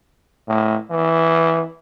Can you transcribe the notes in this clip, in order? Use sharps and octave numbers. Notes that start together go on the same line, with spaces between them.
A2
E3